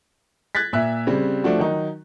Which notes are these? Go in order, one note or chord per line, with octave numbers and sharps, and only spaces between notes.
F#6 G#6 A6 B6
A#2 E5 F#6
C#3 G3 C4
F3 A3 D4 F#4
D#3 F#3 D#4